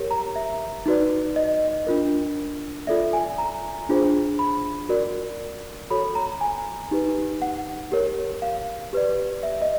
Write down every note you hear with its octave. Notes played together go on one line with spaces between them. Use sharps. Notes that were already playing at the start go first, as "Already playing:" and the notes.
Already playing: G4 A#4 C#5
A#5
E5
D#4 F#4 B4 D5
D#5
D4 F4 A#4
F4 A4 D5 E5
G#5
A#5
D4 F4 G#4 C5
B5
F#4 A#4 D5
F#4 A4 C#5 B5
A#5
G#5
D#4 G4 B4
F#5
G4 A#4 C#5
F5
G4 B4 D5
E5
D#5